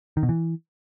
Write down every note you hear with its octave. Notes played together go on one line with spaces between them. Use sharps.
D#3
B2
E3